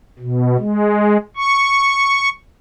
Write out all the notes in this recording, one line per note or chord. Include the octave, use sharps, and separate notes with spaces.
B2
G#3
C#6